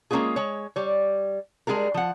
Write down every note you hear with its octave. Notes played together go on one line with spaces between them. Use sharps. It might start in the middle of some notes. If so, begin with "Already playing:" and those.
G#3 A#3 C4 C#4 F4 G#4
G#3 C#5
G3 C#5
G3 G#3 F4 G#4 A#4
F3 F#5